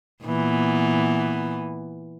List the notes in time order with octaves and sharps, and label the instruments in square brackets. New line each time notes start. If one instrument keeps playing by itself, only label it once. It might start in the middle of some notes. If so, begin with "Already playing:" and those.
[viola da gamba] A#2 E3 B3